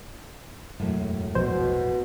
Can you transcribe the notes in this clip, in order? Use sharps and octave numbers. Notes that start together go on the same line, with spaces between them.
E1 F#2 A2 G#3
A#1 B2 C5